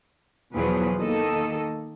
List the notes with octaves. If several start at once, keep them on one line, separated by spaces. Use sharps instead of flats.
E2 B2 F3 F#3 G#4 B4
D#3 A#3 A4 D#5